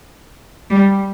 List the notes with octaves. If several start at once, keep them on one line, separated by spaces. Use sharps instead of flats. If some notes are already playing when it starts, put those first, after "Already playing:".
G3